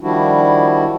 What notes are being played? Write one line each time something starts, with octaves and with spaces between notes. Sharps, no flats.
D#3 F3 G3 D4 E4 F#4